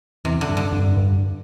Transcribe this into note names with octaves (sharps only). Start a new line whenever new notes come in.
E2 C3
D3
G2
D3
G2
G2